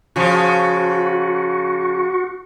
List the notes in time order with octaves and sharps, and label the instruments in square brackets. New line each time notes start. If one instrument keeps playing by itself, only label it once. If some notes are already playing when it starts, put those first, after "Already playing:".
[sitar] C#3 F3 [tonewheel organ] F#4